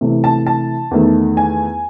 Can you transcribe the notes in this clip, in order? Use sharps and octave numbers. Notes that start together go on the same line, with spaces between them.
C3 E3 A3
A5
A5
E2 D#3 A3
G#5